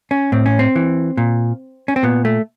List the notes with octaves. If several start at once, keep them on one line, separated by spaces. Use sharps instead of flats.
C#4
A2 C4
C#4
C4
E3
A#2
C#4
C4
A#2 B3
A3